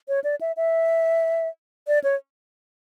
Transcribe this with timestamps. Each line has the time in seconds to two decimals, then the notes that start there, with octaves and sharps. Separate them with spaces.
0.08 C#5
0.24 D5
0.41 E5
0.57 E5
1.88 D5
2.04 C#5